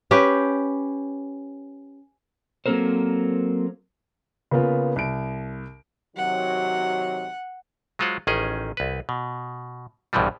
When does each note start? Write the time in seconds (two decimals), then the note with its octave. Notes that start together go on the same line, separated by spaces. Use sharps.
0.11 C#4 G4 B4
2.66 F#3 A#3 C4 A4 A#4 C5
4.51 C#3 A#3 B3 F4
4.96 C2 D7
6.16 C3 D#3 F#3 F#5
7.99 F#3 G#3 F4 C5 F#5
8.27 A1 D#3 C#4 G#4 D#5
8.77 C2 B4
9.09 B2
10.13 A#1 G2 B2 E3 F3 G3